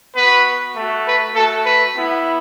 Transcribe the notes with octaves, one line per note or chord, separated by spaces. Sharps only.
B3 F#4 B4
A3 F#4
B4
A3 F#4 A4
B4
B3 E4